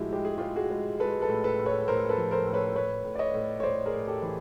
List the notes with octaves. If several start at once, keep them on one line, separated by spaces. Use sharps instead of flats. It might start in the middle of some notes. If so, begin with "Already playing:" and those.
Already playing: A2 F3 G#3 E4 F#4 G4
G#3 G4
G#4
G#3 F4 G4
F#4 G#4
G#3
G#3 A4 B4
A4 B4
A2
A4 B4
A2
B4 C#5
A2 A#4 C5
A4 B4
F3
A#4 C5
A2
B4 C#5
A2 B4 C#5
A2
D5
C#5 D#5
A2
C#5
A2 C5 D5
G#4 A#4
A2
G4 A4
E3